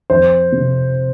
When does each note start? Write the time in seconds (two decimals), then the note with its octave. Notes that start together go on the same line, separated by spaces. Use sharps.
0.10 F2 C5
0.52 C3